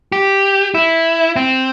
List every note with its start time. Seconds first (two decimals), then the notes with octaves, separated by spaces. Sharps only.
0.12 G4
0.74 E4
1.36 C4